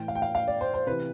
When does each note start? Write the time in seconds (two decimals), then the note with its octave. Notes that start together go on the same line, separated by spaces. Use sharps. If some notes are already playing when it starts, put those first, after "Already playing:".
Already playing: A2 E3 G5
0.08 F5
0.15 G5
0.22 F5
0.35 F5
0.48 D5
0.61 C5
0.74 C5
0.87 C3 E3 B4